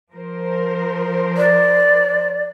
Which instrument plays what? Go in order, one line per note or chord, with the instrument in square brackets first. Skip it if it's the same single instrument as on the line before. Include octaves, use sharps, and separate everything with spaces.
[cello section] F3 A#4 C5
[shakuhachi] D5